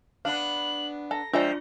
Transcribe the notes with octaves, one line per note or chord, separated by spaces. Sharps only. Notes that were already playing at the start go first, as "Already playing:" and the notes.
B3 D4 F5 F#7
A4 A#5 A#6
F3 G#3 D4 F4 D5 E5 G5